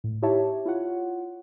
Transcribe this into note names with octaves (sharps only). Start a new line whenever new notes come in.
A2
D#4 E4 G4 C#5 E5 A5
E4 F4 C#5 F#5